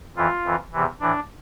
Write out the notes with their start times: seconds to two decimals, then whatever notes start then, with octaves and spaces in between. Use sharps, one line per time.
0.16 F2 E3 F4
0.44 F2 E3
0.72 E2 C3 E3
1.00 A2 E3 D4